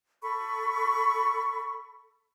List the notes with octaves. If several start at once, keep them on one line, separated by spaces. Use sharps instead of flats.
A4 B5 C#6